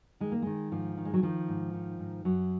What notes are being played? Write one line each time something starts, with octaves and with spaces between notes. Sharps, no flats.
D#3 G#3
A#3
D#3 G#3
G#2 F3
D#3
G#3
F#3
D#3 F3
G#2
D#3
G#2
F#2 F#3